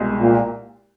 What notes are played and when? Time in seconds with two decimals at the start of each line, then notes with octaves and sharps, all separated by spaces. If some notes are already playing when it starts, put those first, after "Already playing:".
Already playing: C2 B2 G#3
0.20 A#2